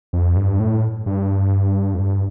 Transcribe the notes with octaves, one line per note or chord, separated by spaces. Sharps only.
F2
G2
A2
G2
F2
G2